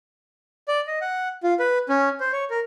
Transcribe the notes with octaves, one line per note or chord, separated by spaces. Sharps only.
D5
D#5
F#5
F4
B4
C#4
C5
C#5
A#4